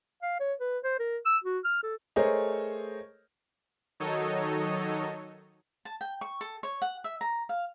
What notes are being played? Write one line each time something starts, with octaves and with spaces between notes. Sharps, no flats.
F5
C#5
B4
C5
A#4
E6
F#4
F6
A4
A3 G#4 A#4 C5 C#5 D#5
D#3 F#3 D#4 A4 C#5 D#5
A5
G5
C#6
A4
C#5
F#5
E5
A#5
F5